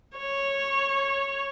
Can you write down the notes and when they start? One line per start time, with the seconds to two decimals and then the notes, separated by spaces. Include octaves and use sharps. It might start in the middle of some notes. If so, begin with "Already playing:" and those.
0.17 C#5